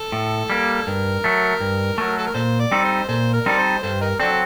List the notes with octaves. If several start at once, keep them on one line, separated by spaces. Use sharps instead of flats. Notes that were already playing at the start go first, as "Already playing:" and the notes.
Already playing: A4
A2
G3 A#3
G2 A#4
F#3 A3
G2
F#3 A3
A4
A#4
A#2 A4 C5
D5
G3 C4 D#4 A4
C5
A#2 A4 C5
A#4
G3 C4 D#4 A4 D5
C5
G2 A4 C5
D#4 A#4
F#3 C4 D4 A4